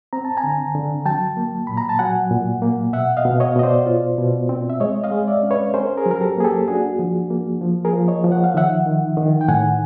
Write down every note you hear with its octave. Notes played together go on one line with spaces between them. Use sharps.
C4 A#5
A5
G#5 A#5
D3
D3
F#3 G5 A5
A#3
A#2 B5
A#5
A5
F#3 F#5 G#5
A#2
A#3
B2 E5 F#5
D#5 F5
B2
C#5 D#5
B2 D#5
C5 D5
F4
B2
C4
E5
G#3 C#5 D#5
D#5 F5
G#3
D5 E5
C#4
B4 C#5
C#4 A#4 C5
G#4 A#4
F#3
A#4
G4 A4
A#3 G#4
G4 A4
D4 F#4 G#4
F3
A#3
F3
G#4 A#4
F3
C#5 D#5
F3
F#5
F5
D#3 E5 F#5
D#3
D#3
G5
A2 F#5 G#5